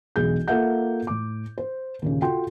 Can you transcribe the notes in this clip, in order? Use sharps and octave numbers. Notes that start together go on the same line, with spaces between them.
E1 B1 G#4 G6
A#3 F4 A4 E5 F#5 G6
A2 D6
C5
D#2 A#2 C#3
F4 F#4 A4 G5 C6